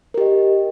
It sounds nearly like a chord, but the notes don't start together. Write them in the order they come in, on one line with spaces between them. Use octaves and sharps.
A#4 G4 D#5